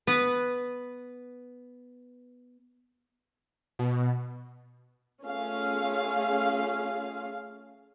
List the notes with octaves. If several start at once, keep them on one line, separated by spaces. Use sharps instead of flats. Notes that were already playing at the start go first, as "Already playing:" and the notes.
B3 B4
B2
A3 C#4 F4 G#4 F5